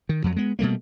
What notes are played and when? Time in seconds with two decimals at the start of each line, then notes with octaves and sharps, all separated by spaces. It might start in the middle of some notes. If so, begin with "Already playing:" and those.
0.09 D#3
0.24 F2 F#3
0.36 G#3 B3
0.59 B2 G3 A3 A#3